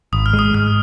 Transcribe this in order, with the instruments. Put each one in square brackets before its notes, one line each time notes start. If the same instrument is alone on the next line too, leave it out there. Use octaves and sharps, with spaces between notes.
[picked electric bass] G#1 [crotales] D#6
[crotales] F6
[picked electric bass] G#3
[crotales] D#6
[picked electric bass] G#2 [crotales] F6